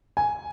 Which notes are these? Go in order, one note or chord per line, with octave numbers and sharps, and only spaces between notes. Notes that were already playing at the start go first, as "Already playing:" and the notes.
G#5